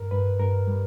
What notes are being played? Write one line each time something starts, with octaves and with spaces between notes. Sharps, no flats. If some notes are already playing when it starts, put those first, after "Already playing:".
Already playing: G2 A#4
G2 B4
G2 A#4
G3